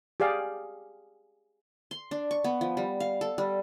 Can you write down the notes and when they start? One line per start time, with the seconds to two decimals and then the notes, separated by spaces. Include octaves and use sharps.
0.20 G4 G#4 D5 F5
1.91 C6
2.11 D4
2.31 C#6
2.44 B3
2.61 F3
2.77 G3
3.00 F5
3.21 A4
3.38 G3